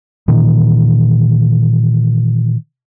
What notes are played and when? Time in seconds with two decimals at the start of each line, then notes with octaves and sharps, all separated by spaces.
0.28 A#2 D#3 E3